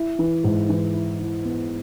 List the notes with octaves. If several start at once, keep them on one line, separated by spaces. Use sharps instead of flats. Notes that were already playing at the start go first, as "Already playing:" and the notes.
Already playing: E4
E3
G#2
E3
E4
E4
B3